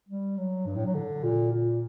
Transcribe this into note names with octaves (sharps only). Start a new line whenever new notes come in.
G3
F#3
G2
A2
F#3
D3
A#2
A#2